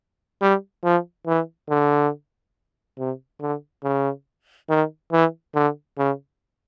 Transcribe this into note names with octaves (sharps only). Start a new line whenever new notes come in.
G3
F3
E3
D3
C3
D3
C#3
D#3
E3
D3
C#3